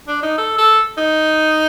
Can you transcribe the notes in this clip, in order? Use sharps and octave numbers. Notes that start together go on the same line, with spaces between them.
D4
D#4
A4
A4
D#4